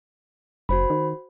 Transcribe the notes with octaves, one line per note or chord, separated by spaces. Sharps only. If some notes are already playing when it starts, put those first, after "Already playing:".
F#1 F#4 C5 B5
D#3